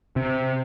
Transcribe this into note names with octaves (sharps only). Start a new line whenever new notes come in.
C3